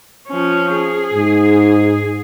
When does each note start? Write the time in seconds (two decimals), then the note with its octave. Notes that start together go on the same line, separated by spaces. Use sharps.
0.28 F3 C#4
0.74 G#4
1.14 G#2